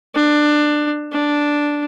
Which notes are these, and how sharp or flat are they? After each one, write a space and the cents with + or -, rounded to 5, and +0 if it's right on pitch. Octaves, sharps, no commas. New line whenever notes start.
D4 +15
D4 +0